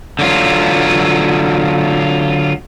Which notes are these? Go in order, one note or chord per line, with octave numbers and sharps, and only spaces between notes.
D3 F#3 F4